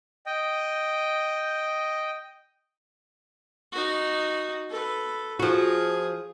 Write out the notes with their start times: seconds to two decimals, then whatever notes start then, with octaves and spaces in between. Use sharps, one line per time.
0.26 D#5 G5
3.72 D#4 F#4
4.69 A4 B4
5.39 F3 F#4 G#4